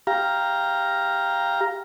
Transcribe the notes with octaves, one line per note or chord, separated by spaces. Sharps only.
G4 F5 A#5